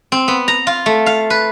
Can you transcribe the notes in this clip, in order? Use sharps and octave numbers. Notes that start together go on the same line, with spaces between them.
C4
B3
A#5
F4
A3
F5
B4